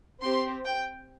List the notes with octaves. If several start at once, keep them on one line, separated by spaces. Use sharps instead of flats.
C4 G4 C6
G5